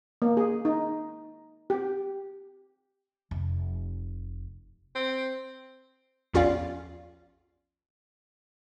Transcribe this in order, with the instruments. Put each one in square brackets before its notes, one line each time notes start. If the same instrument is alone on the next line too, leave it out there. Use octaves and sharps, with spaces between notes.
[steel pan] A#3
G#4
D#4
G4
[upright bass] F1
[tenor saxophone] C4
[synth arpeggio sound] A#1 E2 C#4 F4 D5 F5